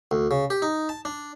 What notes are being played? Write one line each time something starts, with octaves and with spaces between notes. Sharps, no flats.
D2
C#3
G4
D#4
A5
D4